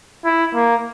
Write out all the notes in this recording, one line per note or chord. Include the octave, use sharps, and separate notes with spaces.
E4
A#3